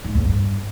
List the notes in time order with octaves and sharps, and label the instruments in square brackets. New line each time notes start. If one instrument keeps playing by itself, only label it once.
[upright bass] G#2
E2
G2